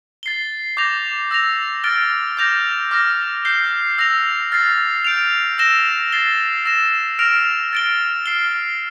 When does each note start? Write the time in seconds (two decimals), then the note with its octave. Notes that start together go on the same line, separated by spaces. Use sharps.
0.23 A6 C7 G7
0.77 D6 G6 A#6 F7
1.31 E6 A#6 F7
1.84 F6 A6 D7 G7
2.37 D6 G6 A#6 F7
2.91 D6 F6 A#6
3.45 G6 C7 G7
3.98 E6 A#6 F7
4.52 F6 A6 C7
5.05 G6 D7 F7
5.58 E6 A#6 E7 G7
6.12 A6 C7 G7
6.65 E6 A#6 E7
7.19 F6 A#6 D7 F7
7.73 A6 D7 G7
8.26 F6 C7 G7